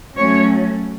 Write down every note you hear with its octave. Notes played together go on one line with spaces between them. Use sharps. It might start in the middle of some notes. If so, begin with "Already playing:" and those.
F#3 A3 C#4 C#5